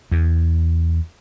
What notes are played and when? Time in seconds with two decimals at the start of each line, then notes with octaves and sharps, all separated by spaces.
0.11 E2